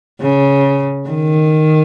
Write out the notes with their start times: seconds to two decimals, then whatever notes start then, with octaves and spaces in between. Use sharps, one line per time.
0.21 C#3
1.10 D#3